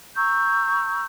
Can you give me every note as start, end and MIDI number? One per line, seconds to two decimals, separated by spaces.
0.16 1.05 82
0.16 1.05 85
0.16 1.05 88
0.16 1.05 91